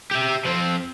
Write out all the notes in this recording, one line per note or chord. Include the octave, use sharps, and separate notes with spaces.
G4 E5
F3 C4